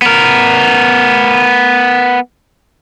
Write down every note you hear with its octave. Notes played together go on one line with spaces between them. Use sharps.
B3 A#4